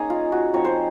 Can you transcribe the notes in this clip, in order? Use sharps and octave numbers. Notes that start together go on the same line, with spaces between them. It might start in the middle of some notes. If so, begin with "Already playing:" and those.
Already playing: A#3 C#4 D#4 G#4
F4
F#4
F3 C4 D#4 C#5
C5